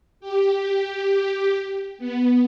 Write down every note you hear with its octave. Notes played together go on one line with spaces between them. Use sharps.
G4
B3